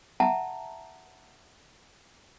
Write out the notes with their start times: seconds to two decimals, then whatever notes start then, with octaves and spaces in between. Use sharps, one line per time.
0.20 E5 F#5 A5 A#5